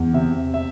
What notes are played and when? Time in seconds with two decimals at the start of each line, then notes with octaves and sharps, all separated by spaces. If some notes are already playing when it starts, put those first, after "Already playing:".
Already playing: E2
0.13 C3 E5
0.54 E5